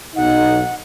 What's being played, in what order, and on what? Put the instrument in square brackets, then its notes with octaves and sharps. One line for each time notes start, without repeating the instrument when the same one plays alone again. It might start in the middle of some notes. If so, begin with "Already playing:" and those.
[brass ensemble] B1 D#4 [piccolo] F#5